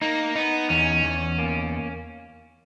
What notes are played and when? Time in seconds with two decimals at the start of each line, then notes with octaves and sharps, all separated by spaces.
0.02 A#3 D#4
0.35 B3 D#4
0.69 E2 C#4
1.04 E2
1.38 A#3